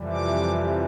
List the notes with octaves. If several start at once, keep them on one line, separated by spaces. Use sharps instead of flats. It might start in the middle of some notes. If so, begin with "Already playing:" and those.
Already playing: F2 C3 E3 G3
D6